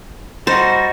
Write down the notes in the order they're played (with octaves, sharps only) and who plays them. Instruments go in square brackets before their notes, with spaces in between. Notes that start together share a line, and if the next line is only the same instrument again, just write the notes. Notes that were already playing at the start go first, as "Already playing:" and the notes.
[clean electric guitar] G3 D#4 F#4 [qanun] C5